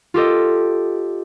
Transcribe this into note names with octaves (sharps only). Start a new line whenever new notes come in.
F4 G4 A4 D#5